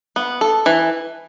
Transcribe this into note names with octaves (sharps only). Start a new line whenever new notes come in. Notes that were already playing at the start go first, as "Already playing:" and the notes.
B3
A4
E3